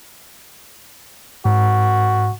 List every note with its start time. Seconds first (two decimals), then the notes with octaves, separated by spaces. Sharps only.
1.45 G#2 F#4